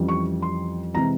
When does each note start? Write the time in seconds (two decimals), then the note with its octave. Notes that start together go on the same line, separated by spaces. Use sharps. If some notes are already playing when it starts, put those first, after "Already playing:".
Already playing: F2 E3 G3 C#4
0.08 C#6
0.42 C6
0.94 C3 E3 G#3 C4 A#5